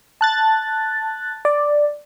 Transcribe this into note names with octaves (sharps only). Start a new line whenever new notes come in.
A5 F#6 A6
D5